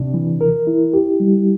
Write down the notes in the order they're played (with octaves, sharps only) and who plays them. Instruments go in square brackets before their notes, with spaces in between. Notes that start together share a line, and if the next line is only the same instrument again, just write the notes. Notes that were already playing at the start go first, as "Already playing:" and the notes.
Already playing: [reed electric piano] C3 D4
E3
A#4
E4
G4
G3